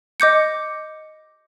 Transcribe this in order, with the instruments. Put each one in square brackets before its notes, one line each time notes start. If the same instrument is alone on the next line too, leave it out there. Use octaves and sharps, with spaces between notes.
[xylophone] D#5 D6 G6 C#7